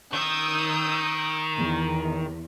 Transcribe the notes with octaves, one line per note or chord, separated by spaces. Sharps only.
D#3 D#6 E6 G6
E2